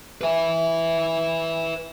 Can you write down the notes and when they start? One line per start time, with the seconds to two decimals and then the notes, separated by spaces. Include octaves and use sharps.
0.21 B4 E5